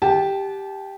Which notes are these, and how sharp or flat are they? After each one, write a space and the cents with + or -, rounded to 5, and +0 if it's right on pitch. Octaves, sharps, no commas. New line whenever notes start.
G4 +0 F#5 +0 A5 -30